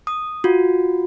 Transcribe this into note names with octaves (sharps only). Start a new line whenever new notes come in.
D#6
F4 F#4